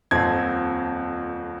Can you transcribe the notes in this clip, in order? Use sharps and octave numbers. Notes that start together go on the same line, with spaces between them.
D#1 F2 C4 A5 G#6